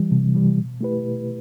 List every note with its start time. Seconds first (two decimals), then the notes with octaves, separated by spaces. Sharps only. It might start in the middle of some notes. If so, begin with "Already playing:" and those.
Already playing: E3 G3
0.11 C3
0.35 E3 G3
0.58 B2
0.81 A3 E4 G4 B4
1.04 B2